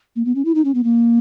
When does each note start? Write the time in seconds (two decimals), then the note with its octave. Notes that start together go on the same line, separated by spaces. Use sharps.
0.16 A#3
0.25 B3
0.35 C#4
0.45 E4
0.55 D#4
0.65 C#4
0.75 B3
0.84 A#3